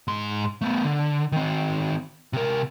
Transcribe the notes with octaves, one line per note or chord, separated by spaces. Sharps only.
G#2 C6
A3 B3
D3
D#3 C4
C3 A#4